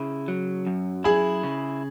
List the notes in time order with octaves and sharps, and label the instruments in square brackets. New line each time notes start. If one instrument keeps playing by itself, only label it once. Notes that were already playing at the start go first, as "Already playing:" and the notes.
Already playing: [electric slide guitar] C#3 E4
F#3
F#2
[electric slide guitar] E4 [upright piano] G#4
[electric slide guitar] C#3